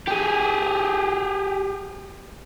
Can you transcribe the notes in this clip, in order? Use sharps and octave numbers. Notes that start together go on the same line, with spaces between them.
G4 G#4